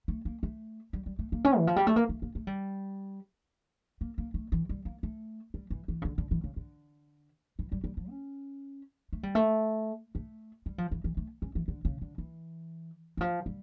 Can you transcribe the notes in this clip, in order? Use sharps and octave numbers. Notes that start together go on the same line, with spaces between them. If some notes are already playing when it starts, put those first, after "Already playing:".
A3
A#3
A3
G3
G3
A3
A#3
C#4
E3
F3
G3
A3
A#3
A3
A#3
A3
G3
A#3
A#3
A3
E3
G3
A#3
A3
G3
E3
E3
C#3
D3
D3
E3
C#3
D3
E3
G3
G3
F3
C#4
A3
G3
A3
A3
G3
F3
E3
E3
A3
C#4
E3
D3
C#3
D3
E3
E3
F3
G3